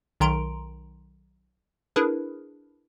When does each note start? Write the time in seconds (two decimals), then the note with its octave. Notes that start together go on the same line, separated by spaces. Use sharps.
0.20 B1 D#3 A#5 C6 D7
1.96 D4 E4 G#4 A#4 B4